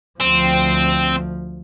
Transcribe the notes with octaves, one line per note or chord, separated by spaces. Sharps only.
D2 F3 C4